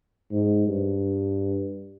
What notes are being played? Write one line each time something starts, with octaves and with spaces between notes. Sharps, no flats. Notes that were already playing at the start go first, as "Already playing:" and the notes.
G#2
G2